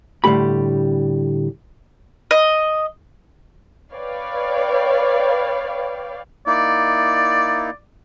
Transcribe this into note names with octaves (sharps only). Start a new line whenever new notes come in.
A2 D3 G3 A3 G4 B5
D#5
B4 C#5 D5 F5 G5
A#3 D#4 E4 D5